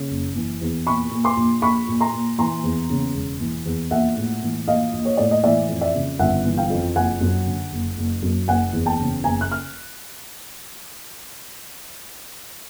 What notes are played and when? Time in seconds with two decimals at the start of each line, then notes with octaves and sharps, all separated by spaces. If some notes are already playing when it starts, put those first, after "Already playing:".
Already playing: C#3
0.10 F#1
0.35 E3
0.61 E2
0.87 A#2 B5 C#6
1.11 A#2
1.24 C6 D6
1.37 A#1
1.62 A#1 B5 C#6
1.88 A#2
2.01 A#5 C6
2.13 A#2
2.38 E3 A#5 C6
2.64 E2
2.90 C#3
3.14 E1
3.40 E3
3.66 E2
3.91 A#1 E5 F#5
4.16 A2
4.42 E3
4.67 A#1 D#5 F5
4.93 A#1
5.05 C#5
5.17 A2 D5
5.31 D#5
5.43 E3 D5 E5
5.69 F2
5.81 D5 E5
5.94 C#3
6.19 G1 E5 F#5
6.45 E3
6.57 F5 G5
6.70 F2
6.96 F#1 F#5 G#5
7.21 F#2
7.46 D3
7.72 F#1
7.97 F#1
8.22 F#2
8.48 F#1 F#5 G#5
8.73 E2
8.86 G5 A5
8.99 C#3
9.24 F#1 G#5 A#5
9.41 F#6
9.52 F6